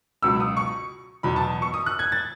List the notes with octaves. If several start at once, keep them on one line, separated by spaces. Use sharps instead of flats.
C#2 B2 F#3 E6
D#6
C#6
E2 B2 F#3 B5
A5
C#6
D#6
F#6
G#6
A6